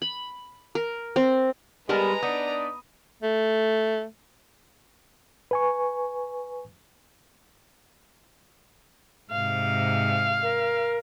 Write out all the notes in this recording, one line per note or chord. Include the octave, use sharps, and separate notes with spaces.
B5
A#4
C4
G3 G#3 B3 A#4 B4 A5 A#5
B3 D4 D#4 D5 D#6
A3
B4 G#5 C#6
G#2 C3 F5
A#4